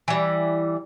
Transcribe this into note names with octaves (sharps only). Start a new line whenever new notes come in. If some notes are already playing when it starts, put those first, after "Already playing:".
E3 G3